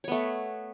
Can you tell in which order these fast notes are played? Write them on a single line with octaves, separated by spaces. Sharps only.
C#5 B3 A3